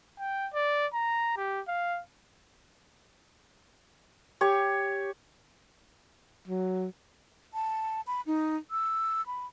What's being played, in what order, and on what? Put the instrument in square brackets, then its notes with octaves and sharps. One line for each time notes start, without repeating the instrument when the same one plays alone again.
[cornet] G5
D5
A#5
G4
F5
[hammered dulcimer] G4 C#5
[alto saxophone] F#3
[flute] A5
B5
D#4
E6
B5